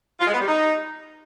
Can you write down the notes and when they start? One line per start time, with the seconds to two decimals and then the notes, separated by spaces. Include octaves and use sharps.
0.19 F4
0.26 G#3
0.33 B3
0.40 G3
0.47 D#4